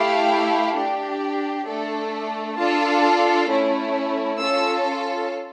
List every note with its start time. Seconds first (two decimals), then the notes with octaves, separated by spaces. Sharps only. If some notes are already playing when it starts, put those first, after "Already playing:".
Already playing: A3 E4 G4 F5
0.75 D4 G4
1.66 A3 D4 A4
2.58 D4 F4 A4 A5
3.49 A3 C#4 E4
4.40 C#4 F4 A4 E6